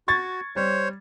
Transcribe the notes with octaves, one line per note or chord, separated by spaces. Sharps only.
F#4 C#6 G#6 A6
G3 C5 C#5